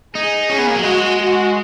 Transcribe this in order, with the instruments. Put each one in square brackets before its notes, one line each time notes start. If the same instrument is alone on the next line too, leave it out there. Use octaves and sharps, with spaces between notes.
[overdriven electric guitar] D#4 [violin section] G#4
[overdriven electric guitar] C#4 [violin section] G#4
[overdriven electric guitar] B3
A#3
F#3
[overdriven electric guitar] G#3 [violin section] F#4
[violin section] F#4